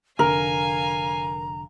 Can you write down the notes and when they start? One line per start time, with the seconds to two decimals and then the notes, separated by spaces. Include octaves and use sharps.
0.19 F1 D3 A#4 F5 G#5 A#5